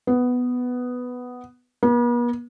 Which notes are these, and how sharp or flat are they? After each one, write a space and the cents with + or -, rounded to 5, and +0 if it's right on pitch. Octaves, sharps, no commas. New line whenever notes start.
B3 +5
B3 -45